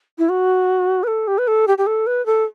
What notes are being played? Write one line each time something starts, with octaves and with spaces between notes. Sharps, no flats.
E4
F#4
B4
A4
G4
B4
A4
G4
G4
A4
B4
A4